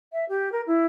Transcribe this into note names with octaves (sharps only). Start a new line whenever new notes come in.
E5
G4
A#4
E4